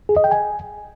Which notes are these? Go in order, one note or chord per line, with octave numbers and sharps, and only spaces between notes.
G#4
D#5
G5
G#5